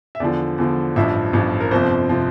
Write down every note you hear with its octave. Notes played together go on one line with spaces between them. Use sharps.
E5
E2 D3 F3 D5
E2 D3 F3
A1 G2 F3 E5
A1 G2 F3
A#4
G1 F2 C3 F3 C5
C3 F3